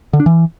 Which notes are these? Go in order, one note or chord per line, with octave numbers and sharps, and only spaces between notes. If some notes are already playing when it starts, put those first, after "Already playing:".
D3
D4
E3